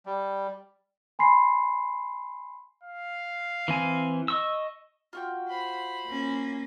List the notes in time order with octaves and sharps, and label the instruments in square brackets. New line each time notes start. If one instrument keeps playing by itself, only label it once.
[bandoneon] G3
[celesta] G#5 B5 C6 C7
[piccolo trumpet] F5
[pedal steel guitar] E3 C4 G#5
D#5 C#6 E6
[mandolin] F4 F#4 G5
[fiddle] C5 B5
[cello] A#3 C#4